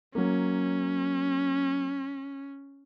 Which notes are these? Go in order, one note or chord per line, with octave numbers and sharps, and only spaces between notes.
F#3 A#3 C#4